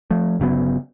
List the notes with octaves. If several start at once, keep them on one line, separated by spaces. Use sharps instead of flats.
F3 A3
G1 C#3 F#3 B3